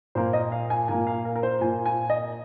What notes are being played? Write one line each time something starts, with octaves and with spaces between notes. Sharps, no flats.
A#2 A#3 F4 C5
D#5
F5
G#5
A#2 A#3 F4 G#5
F5
A#4
A#4
C5
A#2 A#3 F4 G#5
G#5
D#5